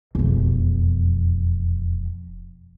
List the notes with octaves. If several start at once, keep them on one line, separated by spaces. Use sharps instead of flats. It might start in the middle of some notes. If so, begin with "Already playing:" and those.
E1 F2